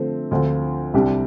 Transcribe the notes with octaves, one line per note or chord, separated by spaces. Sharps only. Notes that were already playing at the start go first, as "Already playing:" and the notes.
Already playing: D3 F3 A3 C4
D2 D3 F3 C4 F4
C2 C3 G3 D4 G4